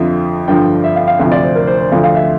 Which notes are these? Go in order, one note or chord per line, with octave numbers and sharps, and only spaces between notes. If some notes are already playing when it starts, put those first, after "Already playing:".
Already playing: F2 D3 F3 E5
G2 D3 F3 G5
E5
F5
F5
D2 C3 F3 F5
D5
C5
A#4
C5
C5
D2 D3 F3 F5
F5
E5